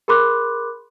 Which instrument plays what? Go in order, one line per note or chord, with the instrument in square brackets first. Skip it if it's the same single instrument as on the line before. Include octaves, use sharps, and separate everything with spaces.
[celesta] G#4 A#4 B5 C6 D6 F#6